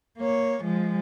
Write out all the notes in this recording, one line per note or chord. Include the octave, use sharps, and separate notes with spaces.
A#3 C#5
F3 G#3